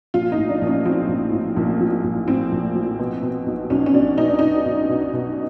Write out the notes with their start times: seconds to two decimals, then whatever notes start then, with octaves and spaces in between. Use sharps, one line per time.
0.14 A#1 F4
0.32 D#4
0.38 A2
0.49 D4
0.62 A#1
0.67 C#4
0.85 F3 C4
1.09 A#1
1.33 A2
1.56 A#1
1.81 F3
2.04 A#1
2.28 A2 C4
2.52 A#1
2.75 F3
2.99 B2
3.22 B2
3.46 B1
3.70 B1 C#4
3.86 C#4
3.94 B2 D4
4.18 B2 D#4
4.28 D4
4.39 B1 D#4
4.65 B1
4.89 B2
5.13 B2